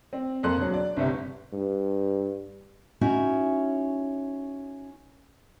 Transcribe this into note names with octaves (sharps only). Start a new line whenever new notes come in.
C4
F2 A#3 A4 C6 F#6
E1 F#3
D5
G1 C2 C3
G2
C#4 D#4 E4 F#4